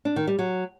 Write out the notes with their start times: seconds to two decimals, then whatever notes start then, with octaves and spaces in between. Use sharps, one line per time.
0.05 D4
0.16 D#3
0.27 G3
0.39 F#3